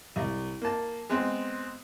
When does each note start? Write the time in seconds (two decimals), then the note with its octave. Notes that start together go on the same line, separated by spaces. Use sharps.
0.16 C2
0.62 A#3 A5
1.09 G#3 B3 C4